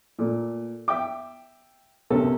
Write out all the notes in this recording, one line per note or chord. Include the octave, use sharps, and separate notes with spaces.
A#2 A3
E5 G5 D6
B1 C3 C#4 A4 A#4